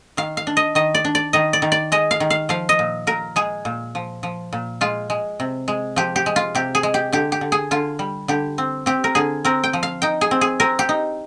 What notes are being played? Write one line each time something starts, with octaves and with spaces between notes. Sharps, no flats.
D#3 F5
F5
D4
D#5
D#3 D#5
D5
D4
D5
D#3 D#5
D5
D#3
D5
G#3 D#5
F5
D#3
F5
F3 F5
D#5
A#2
A#2 A#4
G#3 G#4
A#2
F3
F3
A#2
G#3 F4
G#3
C3
G#3
F3 G4
G4
G#3
F4
C3 G4
G#4
G#3
G4
D3 G4
G4
D3
G#4
D3 F4
G3
D3 G4
C4
C4 G4
A#4
D3 G#4
C4 A#4
G5
F3
F5
D#4 G5
G#4
C4
G#4
C4 A#4
G4
D#4